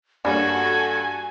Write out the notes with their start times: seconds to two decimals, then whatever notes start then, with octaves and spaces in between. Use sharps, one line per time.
0.25 G2 G3 A#3 C#4 F#4 A4 G#5